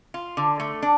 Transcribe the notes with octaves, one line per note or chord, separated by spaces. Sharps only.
F4
D3
A3
D4